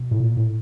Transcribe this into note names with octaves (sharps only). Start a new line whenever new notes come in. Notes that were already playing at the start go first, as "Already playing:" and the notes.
Already playing: B2
A2
A#2
A2